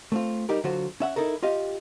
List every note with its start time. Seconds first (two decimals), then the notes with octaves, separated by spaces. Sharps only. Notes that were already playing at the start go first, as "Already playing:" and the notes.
0.12 A3 C4 F4
0.49 G3 D#4 G4 A#4
0.64 D3 F#3 F4 F#4 C5
1.00 C#4 E5 F#5
1.16 D#4 E4 A4 A#4
1.43 F4 G4 D#5 F5